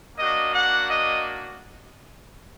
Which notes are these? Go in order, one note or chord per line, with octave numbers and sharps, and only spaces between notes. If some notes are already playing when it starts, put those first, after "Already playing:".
A#3 D4 F#4 D#5
F#5
D#5